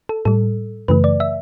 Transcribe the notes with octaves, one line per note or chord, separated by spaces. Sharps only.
A4
A2 G3 A4
F#2 C#3 E3 A3 B4
D5
E5